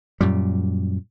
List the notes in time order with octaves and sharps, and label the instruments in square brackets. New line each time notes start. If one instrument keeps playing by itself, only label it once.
[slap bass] F#2 A#2 G3